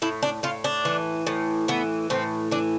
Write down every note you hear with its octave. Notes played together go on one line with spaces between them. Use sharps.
A2 E4
D4
A2 F4
D4
E3
A2
E3 B3
A2 C4
E3 D4